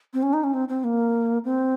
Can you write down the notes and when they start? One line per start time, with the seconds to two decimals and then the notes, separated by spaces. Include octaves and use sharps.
0.14 C4
0.23 C#4
0.33 D#4
0.44 C#4
0.54 C4
0.69 C4
0.84 A#3
1.44 C4